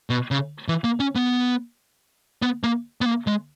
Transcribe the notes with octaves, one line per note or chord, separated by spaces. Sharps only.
B2
C#3
E3
A#3
C#4
B3
B3
A#3
B3
A#3
G#3